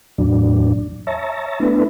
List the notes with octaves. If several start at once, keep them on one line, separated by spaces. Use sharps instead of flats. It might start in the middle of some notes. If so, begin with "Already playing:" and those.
E2 A2 F#3 D4
C#5 E5 A5 A#5
A3 B3 D4 E4 B4